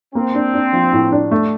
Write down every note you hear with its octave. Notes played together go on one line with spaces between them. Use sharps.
A#3 C4
D4
D4
F3
A2
D4
A3